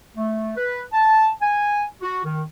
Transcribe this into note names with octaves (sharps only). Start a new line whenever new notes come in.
A3
B4
A5
G#5
F#4
D#3